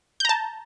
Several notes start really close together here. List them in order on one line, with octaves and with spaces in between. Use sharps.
G6 A#5 A5